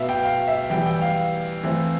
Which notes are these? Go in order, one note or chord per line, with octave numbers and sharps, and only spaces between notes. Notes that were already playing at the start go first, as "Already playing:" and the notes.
Already playing: B2 B3 E5 F5
G5
F5
E5
E3 G3 B3 G5
G5
F5
E3 A3 C4